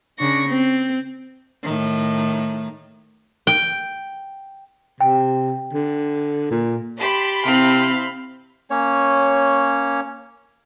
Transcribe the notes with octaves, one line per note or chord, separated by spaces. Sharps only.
C#3 D4 C#6 A#6
C4
A2 D#3
G5
C3 G5
D3
A#2
G4 A5 B5 C6
C3 C4 E4 F5
A#3 C#4 C#5